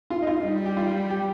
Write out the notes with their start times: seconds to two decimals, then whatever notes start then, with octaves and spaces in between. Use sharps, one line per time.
0.10 F4
0.22 D#4
0.27 F4
0.43 G3 D#4
0.66 G4
0.77 F4
1.10 G4